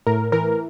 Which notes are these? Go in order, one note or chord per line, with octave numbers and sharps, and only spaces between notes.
A2 A#4
E3 A#4